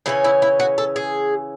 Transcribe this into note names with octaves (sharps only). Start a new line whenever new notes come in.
C#3 E3 A3 C#4 E4
E4
E4
F#4
A4
G#4